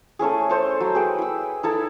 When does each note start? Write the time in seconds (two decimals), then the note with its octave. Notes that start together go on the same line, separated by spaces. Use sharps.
0.19 A3 C#4 E4 G#4
0.49 A4 C5 C#5 A5
0.81 F#3
0.95 G#4 B4 G5
1.18 E4 E6
1.63 D#4 E4 A4